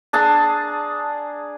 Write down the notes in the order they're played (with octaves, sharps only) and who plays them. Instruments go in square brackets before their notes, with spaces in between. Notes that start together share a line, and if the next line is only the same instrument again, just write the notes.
[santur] D4 G#4 A5 A#5